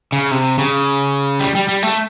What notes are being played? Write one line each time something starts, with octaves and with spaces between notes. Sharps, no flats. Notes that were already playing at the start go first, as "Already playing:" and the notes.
C#3
C3
C#3
G3
G3
G3
A3